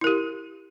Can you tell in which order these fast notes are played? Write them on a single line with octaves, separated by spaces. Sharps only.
E4 A#4 G4